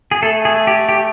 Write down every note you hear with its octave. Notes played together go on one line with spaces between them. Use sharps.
G#4
A3 A4
G#4
G4
G4